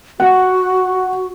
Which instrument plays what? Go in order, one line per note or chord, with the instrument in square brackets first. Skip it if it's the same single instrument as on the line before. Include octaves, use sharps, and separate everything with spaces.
[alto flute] F#4 [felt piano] F#5